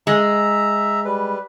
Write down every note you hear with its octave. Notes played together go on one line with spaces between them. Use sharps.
G#3 E5 A#5
G3 B4